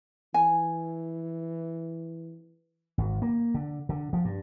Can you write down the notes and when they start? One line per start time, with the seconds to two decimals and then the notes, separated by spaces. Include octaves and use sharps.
0.34 E3 G#5
2.98 G#1
3.22 A#3
3.54 D3
3.89 D3
4.13 F3
4.25 G2